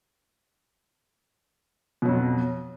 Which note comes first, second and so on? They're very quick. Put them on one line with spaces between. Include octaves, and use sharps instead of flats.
B2 F#3 F2